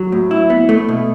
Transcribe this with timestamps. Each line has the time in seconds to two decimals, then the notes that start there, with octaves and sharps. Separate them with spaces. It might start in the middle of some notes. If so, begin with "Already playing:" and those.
Already playing: F#3
0.12 A2
0.31 E4
0.50 B3
0.69 A3
0.89 B2